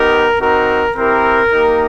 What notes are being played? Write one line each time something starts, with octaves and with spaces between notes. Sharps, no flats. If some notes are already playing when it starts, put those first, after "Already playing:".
Already playing: B3 D#4 G4 A#4
C4 D#4 F#4 A#4
C4 E4 G4 A#4
A#3 D#4 G4